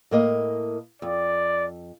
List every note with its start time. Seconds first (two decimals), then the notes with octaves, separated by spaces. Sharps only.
0.11 A2 A#3 D#5
1.02 F2 D5